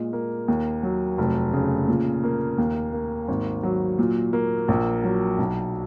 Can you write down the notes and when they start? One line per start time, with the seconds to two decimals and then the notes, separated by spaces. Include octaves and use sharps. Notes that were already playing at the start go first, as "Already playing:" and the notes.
Already playing: A#2 G#3
0.13 A#3
0.48 D#2
0.83 F#3
1.18 F1
1.53 C#3
1.88 A#2
2.24 A#3
2.58 D#2
2.93 A#3
3.28 G#1
3.63 F#3
3.98 A#2
4.33 A#3
4.68 A#1
5.04 F#3
5.38 B1